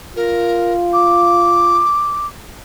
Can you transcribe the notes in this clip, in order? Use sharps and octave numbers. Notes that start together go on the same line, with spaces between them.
F4 A#4
D6